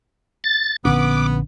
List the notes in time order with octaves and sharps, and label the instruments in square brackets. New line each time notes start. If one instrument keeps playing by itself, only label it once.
[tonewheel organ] A6
[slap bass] A#1 D3 C#4 [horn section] B3 [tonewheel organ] D6